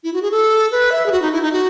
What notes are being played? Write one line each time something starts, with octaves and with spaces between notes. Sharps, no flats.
E4
F#4
G#4
A4
B4
E5
G#4
F#4
D#4
E4
D#4
F#4